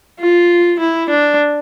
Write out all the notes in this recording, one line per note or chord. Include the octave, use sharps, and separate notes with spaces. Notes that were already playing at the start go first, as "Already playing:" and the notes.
F4
E4
D4